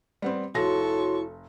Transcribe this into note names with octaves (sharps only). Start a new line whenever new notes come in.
G3 B3 C4
F1 E4 F#4 A4 C#5 C6 C#6 A#6